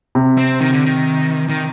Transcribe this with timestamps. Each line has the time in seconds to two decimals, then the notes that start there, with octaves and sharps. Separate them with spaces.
0.15 C3
0.38 C4
0.60 D#3
0.73 D3
0.86 D#3
1.49 D#3